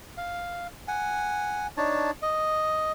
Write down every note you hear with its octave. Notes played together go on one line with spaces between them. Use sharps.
F5
F#5 G#5
D4 D#4 C#5 A5
D#5